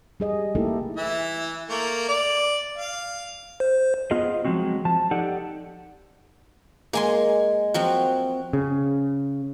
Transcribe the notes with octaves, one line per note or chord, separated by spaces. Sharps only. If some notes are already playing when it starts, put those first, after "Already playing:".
G3 G#4 D#5
A3 A#3 D#4 E4 G4 A4
E3 E5
A3 A#3
D5
F5
C5
B3 F4 G#4 D#5
F3 F#3 G#3 C4 F#4
F3 A5
D#4 G4 A4 D5 F#5
G#3 A#3 G#5 C6
F3 F#3 C4 F#4
C#3